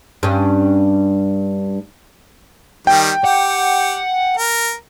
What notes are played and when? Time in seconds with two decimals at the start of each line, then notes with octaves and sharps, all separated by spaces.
0.23 G2 C#4
2.87 D#3 G3 G5
3.25 G4 F#5
4.37 A#4